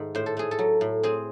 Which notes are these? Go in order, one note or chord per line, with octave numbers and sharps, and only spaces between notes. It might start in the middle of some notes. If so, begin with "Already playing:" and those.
Already playing: G#2 D#3 A3
A2 C5
A4
A3 G#4
A4
F#3
A2
C4 G#4